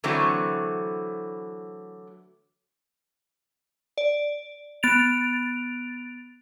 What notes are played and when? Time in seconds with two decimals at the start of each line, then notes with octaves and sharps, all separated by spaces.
0.04 D3 E3 F#3 A3 C4
3.98 D5
4.83 B3 A6 D7 F7